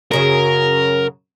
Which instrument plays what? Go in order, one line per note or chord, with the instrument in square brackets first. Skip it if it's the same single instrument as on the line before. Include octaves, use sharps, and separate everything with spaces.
[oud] F#2 C#3 F#3 [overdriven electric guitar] A#4